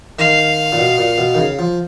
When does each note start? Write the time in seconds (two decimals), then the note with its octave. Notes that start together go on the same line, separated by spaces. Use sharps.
0.19 D#3 F5
0.72 A#2
0.79 B2
0.98 A#2
1.18 B2
1.35 D#3
1.38 C#3
1.59 F3